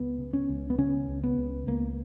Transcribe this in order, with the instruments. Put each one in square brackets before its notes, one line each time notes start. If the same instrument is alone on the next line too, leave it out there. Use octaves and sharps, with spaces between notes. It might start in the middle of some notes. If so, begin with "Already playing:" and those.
Already playing: [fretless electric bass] C#2 B3
C#3
C#4
C#2
B3
C#3 C#4
C#2
B3
C#2
C#2 A#3